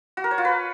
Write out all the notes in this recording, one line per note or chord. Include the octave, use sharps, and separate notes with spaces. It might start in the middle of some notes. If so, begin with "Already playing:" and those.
F#4
A#4
C#5
F4
B4